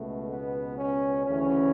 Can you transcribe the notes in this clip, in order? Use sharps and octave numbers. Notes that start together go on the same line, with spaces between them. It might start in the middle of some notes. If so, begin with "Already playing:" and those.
Already playing: C#2 B2 A3
B3
C#4
D2 C#3 E3 C#4